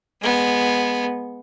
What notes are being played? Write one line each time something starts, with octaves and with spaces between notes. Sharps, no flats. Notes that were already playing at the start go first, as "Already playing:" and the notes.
G#3 B3